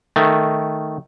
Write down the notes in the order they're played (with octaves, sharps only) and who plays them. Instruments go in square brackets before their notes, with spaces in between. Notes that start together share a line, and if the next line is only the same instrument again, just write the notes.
[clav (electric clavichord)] D#3 A3